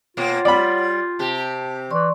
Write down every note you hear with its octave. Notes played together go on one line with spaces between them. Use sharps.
B2 A#3 F4 C#5 F#5
G3 D5 B5
C3 G4 A5
E3 D5 C6 C#6